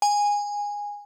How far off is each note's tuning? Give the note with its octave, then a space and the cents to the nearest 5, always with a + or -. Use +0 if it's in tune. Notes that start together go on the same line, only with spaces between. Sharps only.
G#5 -15